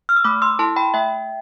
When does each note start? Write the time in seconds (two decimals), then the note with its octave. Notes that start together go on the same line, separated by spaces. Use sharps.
0.09 F6
0.17 E6
0.24 A3 B5 D6
0.42 C6 E6
0.59 E4 A4 A5 C6
0.76 G5 B5
0.94 A3 E5 G5